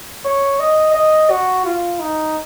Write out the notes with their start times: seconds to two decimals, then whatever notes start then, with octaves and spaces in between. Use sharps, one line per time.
0.25 C#5
0.59 D#5
0.94 D#5
1.30 F#4
1.65 F4
1.99 D#4